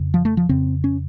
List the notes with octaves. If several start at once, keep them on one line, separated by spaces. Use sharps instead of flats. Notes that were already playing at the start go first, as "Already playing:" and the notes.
Already playing: F2 C#3
F3
A3
F3
F2 C#3 C4
C#4